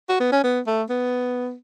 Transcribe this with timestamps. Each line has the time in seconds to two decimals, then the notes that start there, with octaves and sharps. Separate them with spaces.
0.09 F#4
0.20 B3
0.32 C#4
0.44 B3
0.67 A3
0.90 B3